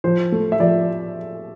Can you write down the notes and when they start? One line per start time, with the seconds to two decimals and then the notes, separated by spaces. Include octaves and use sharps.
0.04 F3 C5
0.32 A3
0.52 E5
0.60 F3 D5